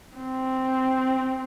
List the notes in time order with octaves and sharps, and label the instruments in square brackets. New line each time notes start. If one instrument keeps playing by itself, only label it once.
[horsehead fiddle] C4